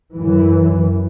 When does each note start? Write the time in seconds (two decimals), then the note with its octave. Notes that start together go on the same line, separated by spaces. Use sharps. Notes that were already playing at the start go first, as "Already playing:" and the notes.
0.15 F#2 E3